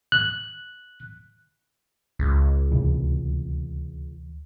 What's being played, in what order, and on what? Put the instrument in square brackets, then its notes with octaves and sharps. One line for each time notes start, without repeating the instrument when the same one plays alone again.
[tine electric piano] F#6
[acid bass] C#2
[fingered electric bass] D2 C3 E3